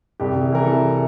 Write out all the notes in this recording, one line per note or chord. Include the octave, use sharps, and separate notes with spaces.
C2 G4
C3
G#4
E3 A#4
C3 A4